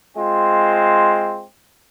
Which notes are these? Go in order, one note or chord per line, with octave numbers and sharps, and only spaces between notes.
G#3 C4 F4